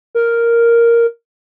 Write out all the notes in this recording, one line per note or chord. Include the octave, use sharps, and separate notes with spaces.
A#4